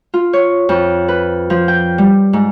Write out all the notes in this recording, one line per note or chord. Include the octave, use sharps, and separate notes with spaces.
F4
C#5
F2
B4
F3
G5
G3
G#2